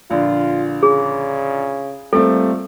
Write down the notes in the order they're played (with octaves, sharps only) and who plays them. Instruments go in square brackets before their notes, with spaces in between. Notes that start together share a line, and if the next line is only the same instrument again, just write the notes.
[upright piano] A#1 D3 [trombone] F4
[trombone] C#3 [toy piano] G#4
[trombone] A#2 [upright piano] G3 A3 C4 [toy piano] A4